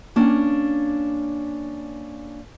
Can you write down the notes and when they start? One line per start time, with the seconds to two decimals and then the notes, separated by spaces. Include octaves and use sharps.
0.16 A#3 C#4 D4